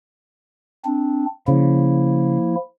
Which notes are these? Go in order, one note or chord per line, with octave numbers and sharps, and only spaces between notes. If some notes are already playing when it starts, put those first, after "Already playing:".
C4 D4
C#3 F3 A#3 E4